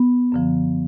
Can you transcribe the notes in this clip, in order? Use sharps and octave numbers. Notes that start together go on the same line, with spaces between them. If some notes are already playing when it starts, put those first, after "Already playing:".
Already playing: B3
F#2 D3 F3